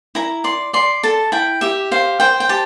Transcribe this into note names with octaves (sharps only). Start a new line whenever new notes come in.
E4 A#5
D5 C6
D5 C6
A4 A5
E4 G5
G4 E5
C5 F5
C5 G5
G5
G4 A5